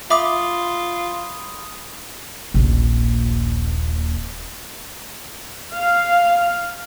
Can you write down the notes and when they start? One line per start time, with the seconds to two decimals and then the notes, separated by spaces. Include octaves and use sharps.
0.10 F4 E5 B5 C6 D6 D#6
2.54 D#1 A#1
5.73 F5